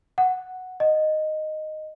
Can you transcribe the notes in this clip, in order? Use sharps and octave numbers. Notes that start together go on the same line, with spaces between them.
F#5
D#5